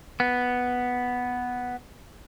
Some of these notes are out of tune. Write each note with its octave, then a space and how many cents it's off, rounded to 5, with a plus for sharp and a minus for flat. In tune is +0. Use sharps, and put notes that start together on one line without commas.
B3 +0